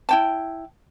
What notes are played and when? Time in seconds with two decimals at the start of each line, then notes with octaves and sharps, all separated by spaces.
0.09 E4 G5 A5